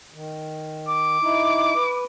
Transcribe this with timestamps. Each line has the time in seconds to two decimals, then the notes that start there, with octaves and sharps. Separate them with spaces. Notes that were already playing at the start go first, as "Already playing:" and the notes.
0.14 D#3
0.88 D6
1.22 D#4 E4
1.76 B4